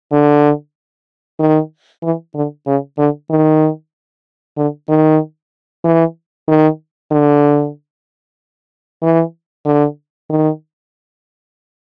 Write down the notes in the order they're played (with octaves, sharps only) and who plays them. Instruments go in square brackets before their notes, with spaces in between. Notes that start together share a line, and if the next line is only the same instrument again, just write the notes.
[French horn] D3
D#3
E3
D3
C#3
D3
D#3
D3
D#3
E3
D#3
D3
E3
D3
D#3